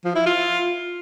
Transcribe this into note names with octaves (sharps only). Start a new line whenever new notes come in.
F3
E4
F4